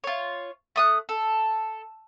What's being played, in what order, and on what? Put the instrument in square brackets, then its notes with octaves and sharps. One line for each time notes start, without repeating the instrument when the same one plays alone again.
[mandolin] F4 C#5
A3 D#6 F#6
A4